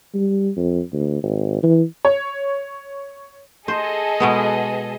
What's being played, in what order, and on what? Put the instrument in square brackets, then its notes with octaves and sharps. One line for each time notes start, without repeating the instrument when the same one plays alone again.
[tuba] G3
F2
D2
G#1
E3
[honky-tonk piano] C#5
[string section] G#4 A4 D#5 [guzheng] C5
[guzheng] B2 G#3 B3